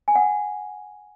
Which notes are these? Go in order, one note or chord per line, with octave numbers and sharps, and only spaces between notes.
G#5
F#5